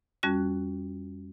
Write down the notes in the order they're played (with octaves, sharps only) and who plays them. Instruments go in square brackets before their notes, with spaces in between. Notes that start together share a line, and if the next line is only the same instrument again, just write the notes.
[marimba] F2 G3 C#4 F#4 F#6